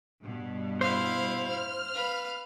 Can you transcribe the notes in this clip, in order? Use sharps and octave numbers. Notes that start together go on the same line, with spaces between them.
G2 B2
E4 C5 F5
F6
B4 F5